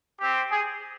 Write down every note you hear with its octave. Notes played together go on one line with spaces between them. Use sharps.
C4 G4
G#4